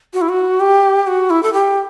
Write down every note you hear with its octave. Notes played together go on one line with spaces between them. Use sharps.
F#4
E4
F#4
G4
F#4
E4
A4
G4